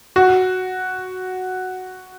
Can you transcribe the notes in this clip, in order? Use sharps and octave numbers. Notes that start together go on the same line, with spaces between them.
F#4